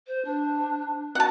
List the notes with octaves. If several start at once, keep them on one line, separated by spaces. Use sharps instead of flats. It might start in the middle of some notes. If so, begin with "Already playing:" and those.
C5
D4
F#4 F#5 A5